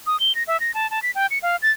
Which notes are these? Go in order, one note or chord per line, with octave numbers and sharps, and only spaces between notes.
D#6
G7
A#6
E5
A#6
A5
A5
B6
G5
C#7
F5
A6